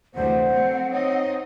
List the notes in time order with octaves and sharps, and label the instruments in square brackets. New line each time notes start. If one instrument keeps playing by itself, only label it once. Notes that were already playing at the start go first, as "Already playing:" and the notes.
[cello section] D2 C3 E3 [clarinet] C5 [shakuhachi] F#5
[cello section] F#3 A3 C4
[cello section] C4 D#4 D#5 [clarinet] C#5